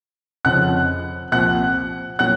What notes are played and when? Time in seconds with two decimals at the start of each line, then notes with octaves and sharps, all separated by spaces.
0.45 F1 F2 C#3 F3 C4 F#5 F#6
1.32 C2 A#2 F3 C4 F#5 F#6
2.19 A#2 F#3 F#5 F#6